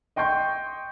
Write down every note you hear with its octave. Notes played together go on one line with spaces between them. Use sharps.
D#5 G5 C6 C#6 G6